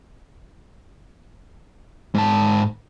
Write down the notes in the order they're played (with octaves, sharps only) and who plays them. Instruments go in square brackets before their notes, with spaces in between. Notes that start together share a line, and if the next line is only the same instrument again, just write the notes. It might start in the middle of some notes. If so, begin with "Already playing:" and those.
[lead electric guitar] G#2 A5